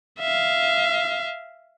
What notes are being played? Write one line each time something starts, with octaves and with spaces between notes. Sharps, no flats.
E5 F5